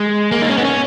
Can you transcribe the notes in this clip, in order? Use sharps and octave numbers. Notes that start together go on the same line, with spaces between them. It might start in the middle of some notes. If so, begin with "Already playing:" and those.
Already playing: G#3
A#3
D#4
C#4
B3
C#4